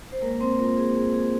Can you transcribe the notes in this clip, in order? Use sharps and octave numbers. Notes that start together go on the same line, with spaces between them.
C5
G#3 A#3 A#4
C4 C5
A#3 F4 A#4
G#4
G#3 G#4
G#4